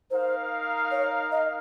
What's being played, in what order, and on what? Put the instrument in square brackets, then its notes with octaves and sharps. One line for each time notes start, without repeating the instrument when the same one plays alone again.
[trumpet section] D#4 A#4 F5 [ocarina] C5
[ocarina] C#5
D#5